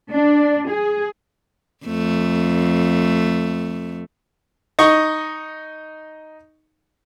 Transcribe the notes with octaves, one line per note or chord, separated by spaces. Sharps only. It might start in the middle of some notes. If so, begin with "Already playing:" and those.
D4
G#4
F2 A3
D#4 D#5 C#6